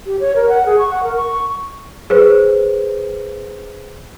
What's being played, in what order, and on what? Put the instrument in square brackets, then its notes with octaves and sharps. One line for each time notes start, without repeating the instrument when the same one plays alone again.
[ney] G4
C#5
A#4
F#5
G#4
C#6
F#5
A#4
C#6
[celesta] G#4 B4 C5